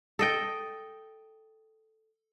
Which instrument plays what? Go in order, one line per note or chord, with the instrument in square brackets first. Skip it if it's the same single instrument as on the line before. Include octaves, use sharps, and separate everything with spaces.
[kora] A4 D#5 G5